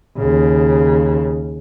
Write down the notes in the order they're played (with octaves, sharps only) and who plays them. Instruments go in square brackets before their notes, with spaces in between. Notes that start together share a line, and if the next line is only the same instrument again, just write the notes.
[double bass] D#2 C#3